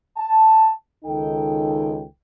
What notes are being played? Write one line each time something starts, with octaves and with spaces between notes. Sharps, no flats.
A5
C#2 D#3 D#4 A4 G5